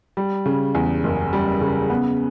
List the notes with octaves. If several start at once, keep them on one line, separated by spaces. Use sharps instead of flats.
G3
C#3
E2
F#1
G3
C#3
B3